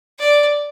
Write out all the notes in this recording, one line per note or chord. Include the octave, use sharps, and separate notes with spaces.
D5